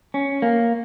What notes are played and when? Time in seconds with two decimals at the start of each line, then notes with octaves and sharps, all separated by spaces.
0.14 C#4
0.42 A#3